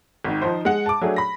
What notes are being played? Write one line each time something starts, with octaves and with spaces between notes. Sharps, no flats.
G#1 D#3
F3 D#4 C5
G#3 F#5
A5 D6
F#3 A3 D4 G#4
B5 A#6